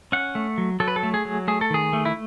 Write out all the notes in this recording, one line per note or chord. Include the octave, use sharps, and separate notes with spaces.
C#4 F#5
A3
F#3
F#3 A4
B4
A4
A3
G#4
F#3
A3 G#4
A4
D#3 G#4
A3
E4